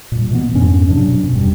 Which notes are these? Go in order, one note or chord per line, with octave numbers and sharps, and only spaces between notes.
G2 A#2
B2 E3 A#3 B3
F2 G#2 C#4 D4
G2 C3 F#3 D4
B2
E2 G2